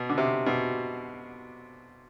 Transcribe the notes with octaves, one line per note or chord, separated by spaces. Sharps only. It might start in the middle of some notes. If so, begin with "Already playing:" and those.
Already playing: B2
D3
C3
B2